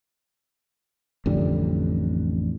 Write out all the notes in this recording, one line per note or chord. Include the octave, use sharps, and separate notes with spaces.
A1 F2 D3 G3